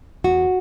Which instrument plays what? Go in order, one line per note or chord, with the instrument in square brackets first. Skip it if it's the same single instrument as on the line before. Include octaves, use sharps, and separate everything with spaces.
[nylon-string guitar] E2 F#4